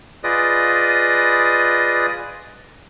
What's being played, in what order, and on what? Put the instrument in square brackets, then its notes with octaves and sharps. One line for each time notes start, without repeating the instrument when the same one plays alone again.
[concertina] F4 G#4 B4 D5 D#5 D#6